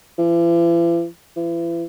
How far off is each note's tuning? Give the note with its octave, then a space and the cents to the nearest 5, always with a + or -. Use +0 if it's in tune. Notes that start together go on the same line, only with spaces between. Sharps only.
E3 +45
E3 +35